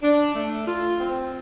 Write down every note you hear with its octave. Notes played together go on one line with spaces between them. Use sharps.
D4
A3
F4
C4